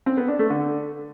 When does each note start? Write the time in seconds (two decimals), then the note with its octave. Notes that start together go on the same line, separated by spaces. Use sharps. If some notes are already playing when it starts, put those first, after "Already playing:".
0.06 C4
0.17 B3
0.28 D4
0.39 A3
0.50 D3